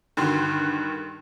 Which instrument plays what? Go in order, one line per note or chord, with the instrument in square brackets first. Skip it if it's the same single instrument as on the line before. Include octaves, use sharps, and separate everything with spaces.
[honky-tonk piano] G2 D3 D#3 F#4 C6